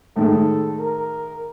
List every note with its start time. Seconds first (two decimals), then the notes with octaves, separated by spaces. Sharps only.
0.16 A2 D#3 G#3 A4
0.79 A#4